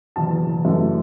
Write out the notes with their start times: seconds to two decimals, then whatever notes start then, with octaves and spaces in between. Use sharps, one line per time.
0.16 F#1 E2 B2 A5
0.65 F#2 E3 A3